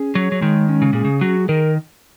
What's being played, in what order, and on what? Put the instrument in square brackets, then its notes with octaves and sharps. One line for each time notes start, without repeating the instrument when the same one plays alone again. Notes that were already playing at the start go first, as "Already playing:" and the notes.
Already playing: [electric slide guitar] C#4 G#4
[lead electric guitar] F#3 [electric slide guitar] C#5
[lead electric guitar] F#3
[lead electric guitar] D#3 [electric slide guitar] G#3
[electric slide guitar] C#4
[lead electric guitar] C#3
[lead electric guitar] A#2 [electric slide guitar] G#4
[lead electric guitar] C#3
[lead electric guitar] F#3 [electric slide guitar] F#4
[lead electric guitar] D#3 [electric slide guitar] A#4